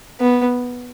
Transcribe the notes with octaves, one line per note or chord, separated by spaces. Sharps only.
B3